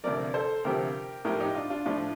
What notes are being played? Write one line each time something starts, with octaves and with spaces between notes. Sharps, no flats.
D2 C3 F3 A#4 D5
A4 C5
D2 C3 F3 G4 A#4
A2 F3 G4 A#4
D#4 G4
D4 F4
D4 F4
A2 F3 D4 F4